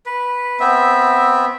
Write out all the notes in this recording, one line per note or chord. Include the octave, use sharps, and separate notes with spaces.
B4
B3 C4 E5